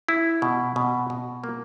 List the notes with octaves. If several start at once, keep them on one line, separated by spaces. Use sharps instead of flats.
E4
B2
B2
B2
A#3